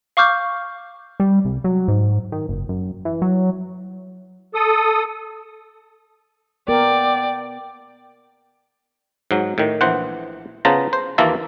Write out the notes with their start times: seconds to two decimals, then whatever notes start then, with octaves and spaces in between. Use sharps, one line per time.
0.17 F5 C#6 D6 F6 G6
1.20 G3
1.45 C2
1.64 F#3
1.88 G#2
2.32 D#3
2.49 F#1
2.69 F#2
3.05 E3
3.22 F#3
4.54 A4 D#6
6.68 B3 A#4 D5 G5
9.31 G#2 F#3
9.58 A2 D#3
9.81 A#1 E3 C5 F#5
10.65 C#3 B3 F4 C5 A5 A#5
10.93 C5
11.18 D#2 E3 A#3 F4 E5 A5